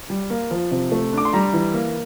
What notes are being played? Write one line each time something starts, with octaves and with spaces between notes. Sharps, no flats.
G3
A#3
F3
C3
A3
D4 D6
C6
G3 A#5
E3
A#3